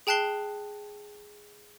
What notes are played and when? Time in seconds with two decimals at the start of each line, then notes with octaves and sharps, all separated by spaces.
0.07 G#4 G5 A5 F#6 C7 G7